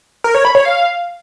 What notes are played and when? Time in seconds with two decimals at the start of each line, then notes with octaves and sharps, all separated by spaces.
0.24 A#4
0.35 C#5
0.45 B5
0.55 C#5
0.65 F5